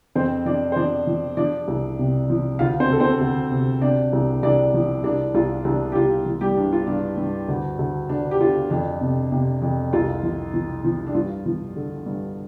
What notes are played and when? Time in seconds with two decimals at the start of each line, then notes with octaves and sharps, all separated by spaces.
0.15 F2 C4 C5
0.46 F3 D4 D5
0.72 C5
0.76 F3 D4 D5
1.07 F3
1.37 F3 D4 D5
1.68 C2
1.99 C3
2.30 F3
2.59 D2 F4 F5
2.80 C4 C5
2.90 D2 A4
3.00 C4 C5
3.21 D2
3.51 C3
3.81 C3 D4 D5
4.13 C2
4.43 C2 D4 D5
4.74 F3
5.04 C2 D4 D5
5.35 C2 F4
5.65 C2 D4
5.92 G4
5.95 C2 F4
6.26 F3
6.41 G3 G4
6.57 G2 D4
6.73 F4
6.87 G2 D4
7.18 G2
7.48 D2
7.79 D2
8.09 D2 D4
8.31 G4
8.40 D3 F4
8.70 F2 D4
9.01 C3
9.32 C3
9.62 F2
9.93 C2 F4
10.23 F3
10.54 F3
10.85 F3
11.07 D4
11.14 G2 F4
11.46 F3
11.76 D3
12.06 G2